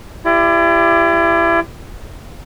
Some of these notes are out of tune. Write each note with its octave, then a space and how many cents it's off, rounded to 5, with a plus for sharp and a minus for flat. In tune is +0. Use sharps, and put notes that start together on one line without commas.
E4 +35 G4 +15 D5 +20